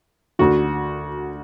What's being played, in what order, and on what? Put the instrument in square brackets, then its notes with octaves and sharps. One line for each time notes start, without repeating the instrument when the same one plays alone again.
[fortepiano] D2 D3 F#4